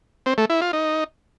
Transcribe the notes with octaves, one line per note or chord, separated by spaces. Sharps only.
C4
A3
E4
F4
D#4